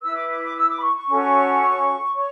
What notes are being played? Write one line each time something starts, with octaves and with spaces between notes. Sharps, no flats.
E4 B4 E6
D6
D6
D6
E6
D6
B5
C#6
C#6
C#4 F#4 A4 C#5
C#5 C#6